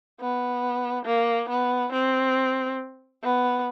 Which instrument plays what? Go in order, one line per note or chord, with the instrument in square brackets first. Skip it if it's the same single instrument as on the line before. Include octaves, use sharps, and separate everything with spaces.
[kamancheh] B3
A#3
B3
C4
B3